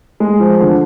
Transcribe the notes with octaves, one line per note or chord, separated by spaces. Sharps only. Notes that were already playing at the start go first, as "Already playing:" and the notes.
G#3
F3
D3